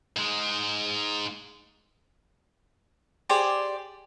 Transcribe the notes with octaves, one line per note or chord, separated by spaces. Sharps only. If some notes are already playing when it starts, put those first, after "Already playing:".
G#2 G#3
G4 G#4 C5 D5